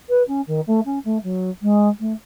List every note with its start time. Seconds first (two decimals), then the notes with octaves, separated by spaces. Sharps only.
0.09 B4
0.28 C#4
0.47 D#3
0.67 A3
0.85 C#4
1.05 A3
1.23 F#3
1.62 G#3
2.00 A3